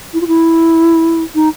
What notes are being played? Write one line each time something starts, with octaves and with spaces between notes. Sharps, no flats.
E4
F4
E4
D#4